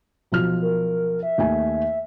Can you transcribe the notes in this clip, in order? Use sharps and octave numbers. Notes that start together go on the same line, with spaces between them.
B1 F3 F6
A#4
E5
D#2 A3 G#5